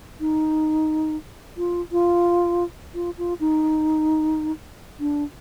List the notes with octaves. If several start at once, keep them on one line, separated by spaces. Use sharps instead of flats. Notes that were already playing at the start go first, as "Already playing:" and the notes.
D#4
F4
F4
F4
F4
D#4
D4